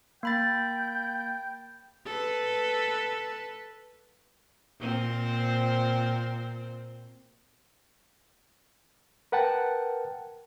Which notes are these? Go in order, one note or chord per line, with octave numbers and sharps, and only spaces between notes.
A#3 G5 B5 A6
A4 B4
A#2 C4 C5
A#4 B4 F#5 G5 A5